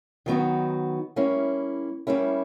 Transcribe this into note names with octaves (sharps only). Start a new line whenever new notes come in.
D#3 F#3 B3 D#4 F#4
G3 A#3 C#4 E4
G3 A#3 C#4 E4